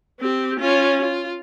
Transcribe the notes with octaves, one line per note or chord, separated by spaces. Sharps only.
C4 G4
C#4 F4
F4